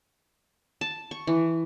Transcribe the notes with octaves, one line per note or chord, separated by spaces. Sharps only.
A5
C#6
E3